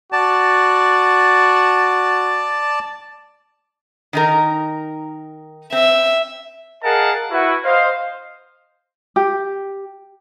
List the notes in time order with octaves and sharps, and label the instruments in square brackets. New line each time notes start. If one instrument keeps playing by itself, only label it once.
[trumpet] F#4 [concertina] D5 A5
[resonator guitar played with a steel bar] D#3 D#4 A#4
[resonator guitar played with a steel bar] C4 [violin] E5
[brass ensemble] G#4 A#4 D#5 F5 F#5 A5
E4 F#4 B4
C5 D#5 F5
[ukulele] G4